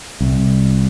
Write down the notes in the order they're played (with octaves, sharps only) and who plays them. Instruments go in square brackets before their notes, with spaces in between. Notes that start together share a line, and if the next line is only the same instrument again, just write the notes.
[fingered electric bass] C2